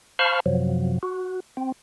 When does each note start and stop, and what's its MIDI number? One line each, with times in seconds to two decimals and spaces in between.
0.19 0.40 72
0.19 0.40 77
0.19 0.40 81
0.19 0.40 83
0.19 0.40 85
0.19 0.40 89
0.46 0.99 42
0.46 0.99 48
0.46 0.99 53
0.46 0.99 54
1.03 1.40 66
1.57 1.72 60